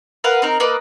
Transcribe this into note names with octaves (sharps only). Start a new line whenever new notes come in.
A#4 B4 F5 F#5
C4 D#4 A#4
A#3 B4 D5 D#5